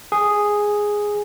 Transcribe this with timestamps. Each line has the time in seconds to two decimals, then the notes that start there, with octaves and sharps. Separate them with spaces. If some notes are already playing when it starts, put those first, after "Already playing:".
0.12 G#4